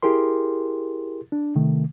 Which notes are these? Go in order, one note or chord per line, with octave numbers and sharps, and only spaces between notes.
E4 G4 G#4 A#4 C6
D4
C3 D#3 A3